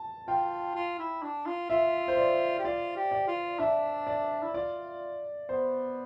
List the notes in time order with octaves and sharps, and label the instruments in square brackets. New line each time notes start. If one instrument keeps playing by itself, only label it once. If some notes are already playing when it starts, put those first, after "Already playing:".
Already playing: [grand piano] A5
[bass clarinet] F4 [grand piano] G5
[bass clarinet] F4
E4
D4
F4
[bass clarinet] F4 [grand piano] E5
[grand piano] C5
D5
[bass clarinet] G4
[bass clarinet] F4 [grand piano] D5
[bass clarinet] G4
[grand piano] D5
[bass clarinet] F4
[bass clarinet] D4 [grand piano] E5
[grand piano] D5
[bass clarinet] E4
[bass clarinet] F4 [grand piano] D5
[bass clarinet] B3 [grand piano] C5